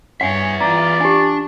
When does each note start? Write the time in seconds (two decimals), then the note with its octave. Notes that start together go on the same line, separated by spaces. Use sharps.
0.21 G2 B3 C#5 E5 F#5 G#5
0.61 E3 F4 D5 A#5
1.01 D4 G4 G#5